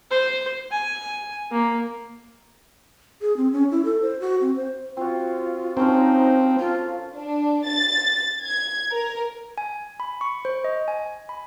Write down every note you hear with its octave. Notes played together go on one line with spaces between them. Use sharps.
C5
G#5
A#3
G#4
C4
C#4
E4
A4
C5
F#4
C4
C5
C4 F4 F#4
F3 C4 C#4 D#4 A#4
F4 A4
D4
A6
G#6
A#4
G#5
B5
C#6
C5
D#5
G#5
B5